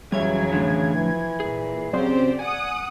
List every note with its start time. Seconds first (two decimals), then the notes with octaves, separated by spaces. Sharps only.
0.12 F2 C#3 E3 F#3 G3 C#5 E5 G#6
0.52 A2 D3
0.95 E3 F3
1.40 A#2 G#4
1.93 C#3 F#3 C4 G4 C5 D5
2.39 F#5 G#5 D#6